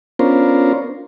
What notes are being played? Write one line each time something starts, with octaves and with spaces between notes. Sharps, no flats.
B3 C#4 D4 F4 A#4 C5